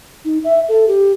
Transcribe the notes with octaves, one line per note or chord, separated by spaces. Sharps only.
D#4
E5
A4
G4